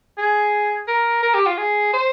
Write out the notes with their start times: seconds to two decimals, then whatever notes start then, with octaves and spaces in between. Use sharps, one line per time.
0.18 G#4
0.88 A#4
1.23 A#4
1.34 G4
1.46 F4
1.57 G#4
1.93 C5